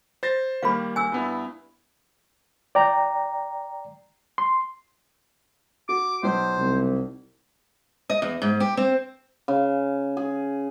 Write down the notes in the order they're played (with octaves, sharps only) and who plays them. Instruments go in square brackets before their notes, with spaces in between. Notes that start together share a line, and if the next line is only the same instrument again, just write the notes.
[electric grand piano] C5 A6 A#6
[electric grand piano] D#3 G3 A#3 [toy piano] F5 B5
[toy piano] G#5 E6
[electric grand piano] G2 B3 E4
[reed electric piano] D5 G5 A#5
C6
[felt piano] F#4 [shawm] D6
[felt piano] B1 [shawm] C5
[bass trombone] C2
[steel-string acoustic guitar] D#5
E2
G#2
G4
C4
[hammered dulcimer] C#3
G#4